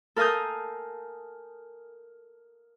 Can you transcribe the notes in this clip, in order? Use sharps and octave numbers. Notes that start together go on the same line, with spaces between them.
A4 A#4 F5 G#5 D#6 G6